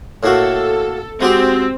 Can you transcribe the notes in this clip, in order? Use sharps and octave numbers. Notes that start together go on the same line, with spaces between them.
A2 A#3 F#4 A4
G#3 C4 F#4 G4